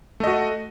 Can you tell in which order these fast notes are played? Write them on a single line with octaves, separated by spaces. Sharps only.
A3 D#5 F#4